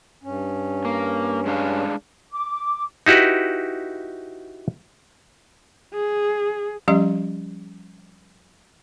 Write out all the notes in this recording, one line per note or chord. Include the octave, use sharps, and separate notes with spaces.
G2 C#4
A#3
G#3 D4 F5
D6
D#4 E4 F#4 G4 B4
G#4
F3 G3 C#4 G4 D#5 C6